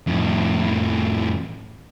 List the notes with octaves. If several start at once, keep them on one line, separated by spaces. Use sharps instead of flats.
F2 A2